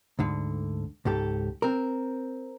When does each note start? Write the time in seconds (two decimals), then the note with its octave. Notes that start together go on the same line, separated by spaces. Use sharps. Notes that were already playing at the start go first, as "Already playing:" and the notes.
0.19 D2 G#2 D3
1.05 C#2 G#2 G4 A4
1.62 C4 A#4